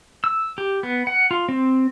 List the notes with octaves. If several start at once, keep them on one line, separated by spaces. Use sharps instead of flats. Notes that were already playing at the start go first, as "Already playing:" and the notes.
E6
G4
B3
F#5
F4
C4